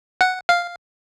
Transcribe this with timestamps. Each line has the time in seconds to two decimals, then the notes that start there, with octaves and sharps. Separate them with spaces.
0.21 F#5
0.49 F5